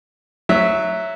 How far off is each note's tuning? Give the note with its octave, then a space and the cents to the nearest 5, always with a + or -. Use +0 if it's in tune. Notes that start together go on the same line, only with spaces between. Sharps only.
F#3 +0 E5 +0